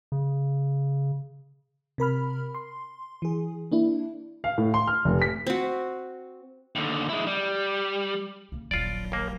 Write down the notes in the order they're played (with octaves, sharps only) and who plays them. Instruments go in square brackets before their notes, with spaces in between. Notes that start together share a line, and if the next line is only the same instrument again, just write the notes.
[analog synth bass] C#3
[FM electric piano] C3 A#4 B5 F6
C6
E3 G#4
A#3 D4 E4
[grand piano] F5
A2
C6
F6
F1
B6
[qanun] C4 F#4
[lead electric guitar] D#2 D3
G#3 E4
G3
[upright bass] C#3 A#3
[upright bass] D#1 D#3 [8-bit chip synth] A#1 F#3 [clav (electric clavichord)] F4 D5
[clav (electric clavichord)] D#2 A#3